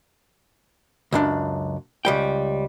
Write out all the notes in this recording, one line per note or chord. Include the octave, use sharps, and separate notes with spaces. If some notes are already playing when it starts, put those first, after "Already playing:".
C#2 F#2 D4
C#2 G3 G5